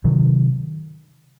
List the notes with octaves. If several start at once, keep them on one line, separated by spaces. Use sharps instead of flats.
C3 D#3 F#3